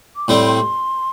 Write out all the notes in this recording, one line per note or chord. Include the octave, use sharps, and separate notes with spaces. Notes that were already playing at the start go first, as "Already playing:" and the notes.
D6
A2 G3 C4 C6
C6